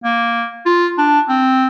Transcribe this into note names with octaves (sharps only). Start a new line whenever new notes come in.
A#3
F4
D4
C4